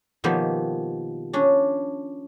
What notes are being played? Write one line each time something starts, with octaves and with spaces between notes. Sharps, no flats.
B2 D#3 F3 G3 A#3 B3
C#4 D4